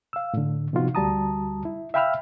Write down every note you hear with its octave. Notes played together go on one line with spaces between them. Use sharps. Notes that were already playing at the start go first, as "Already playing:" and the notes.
F5 E6
A2 D3
C3 F3 B3 D#4 F4 F#4
D2 G3 F#4 A5 A#5 D#6
E4
E5 F5 G5 B5 E6 F6